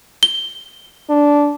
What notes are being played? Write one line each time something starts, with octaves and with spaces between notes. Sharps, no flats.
G7
D4